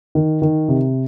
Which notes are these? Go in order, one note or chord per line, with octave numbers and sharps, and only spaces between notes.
D#3
D#3
C3